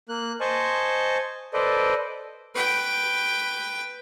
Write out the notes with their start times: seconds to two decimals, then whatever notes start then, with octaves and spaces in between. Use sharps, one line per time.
0.09 A#3 F#6
0.41 C5 D#5 G#5 A5 C#6
1.54 A4 B4 C5 D5 D#5
2.55 B4 G5